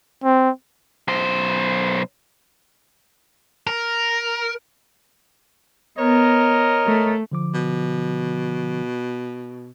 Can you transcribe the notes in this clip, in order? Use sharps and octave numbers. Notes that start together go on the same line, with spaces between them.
C4
B1 C5
A#4
B3 A#4 C#5 D#5
A3
D3 F3 D6
B2